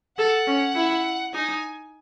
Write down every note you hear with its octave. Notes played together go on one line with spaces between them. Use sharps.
A4 F#5
C#4
E4
D#4 G#5